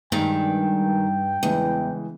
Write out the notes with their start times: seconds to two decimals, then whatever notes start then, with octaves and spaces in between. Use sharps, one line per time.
0.12 G2 D#3 G#3 G5
1.43 E2 C#3 E3 G#3